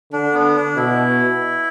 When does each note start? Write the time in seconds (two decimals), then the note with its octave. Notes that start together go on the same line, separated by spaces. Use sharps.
0.13 D3 D4
0.34 B3
0.55 D4
0.76 B2 E4